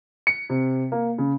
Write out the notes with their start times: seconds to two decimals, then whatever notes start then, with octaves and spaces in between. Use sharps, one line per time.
0.27 C#7
0.50 C3
0.92 A#3
1.18 C#3